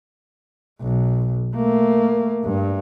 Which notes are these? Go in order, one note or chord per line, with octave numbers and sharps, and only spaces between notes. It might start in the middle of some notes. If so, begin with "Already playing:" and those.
B1
A3 A#3
G2